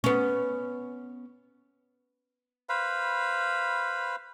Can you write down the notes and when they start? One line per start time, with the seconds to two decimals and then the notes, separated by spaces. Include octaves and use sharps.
0.04 B3 C#4
2.69 B4 C5 F5 B5